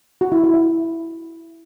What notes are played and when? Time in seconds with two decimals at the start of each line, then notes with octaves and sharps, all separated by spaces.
0.21 F#4
0.32 E4
0.44 E4
0.54 E4